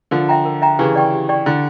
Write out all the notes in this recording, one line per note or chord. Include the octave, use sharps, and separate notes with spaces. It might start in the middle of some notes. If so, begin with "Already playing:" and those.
D3 F3 A#4
E5 G5 A#5
A#4
E5 G5 A#5
C#3 E3 G4
D5 G5 C#6
G4
D5 G5 C#6
D3 E4